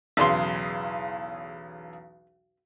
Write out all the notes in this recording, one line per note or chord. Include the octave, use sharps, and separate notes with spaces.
B1 E2 C#3 C6